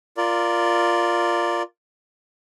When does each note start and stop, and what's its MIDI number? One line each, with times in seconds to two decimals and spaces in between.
0.17 1.63 65
0.17 1.63 70
0.17 1.63 74